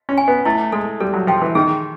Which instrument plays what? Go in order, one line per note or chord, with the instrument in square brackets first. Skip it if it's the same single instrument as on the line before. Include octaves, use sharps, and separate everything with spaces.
[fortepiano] C#4
[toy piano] G#5
[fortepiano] B3
[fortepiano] A3 [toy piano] E4
[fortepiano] G#3 [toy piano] A4
[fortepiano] G3 [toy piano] A4
[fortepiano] F#3
[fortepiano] F3 [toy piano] G5
[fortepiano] E3
[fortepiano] D#3 [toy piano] G#4